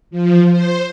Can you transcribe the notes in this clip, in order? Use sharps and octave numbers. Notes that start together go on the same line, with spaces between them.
F3
C5